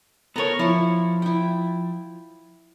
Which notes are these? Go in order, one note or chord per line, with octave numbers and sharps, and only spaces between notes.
B3 A4 A#4 C#5 A#5
F3 E4 C#5
E4 G5